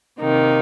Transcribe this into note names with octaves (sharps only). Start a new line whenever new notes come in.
C3 D#3 A#3 D#4